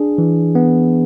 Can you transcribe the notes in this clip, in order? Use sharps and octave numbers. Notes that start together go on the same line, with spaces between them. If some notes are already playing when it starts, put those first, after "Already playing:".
Already playing: D4 G#4
E3
B3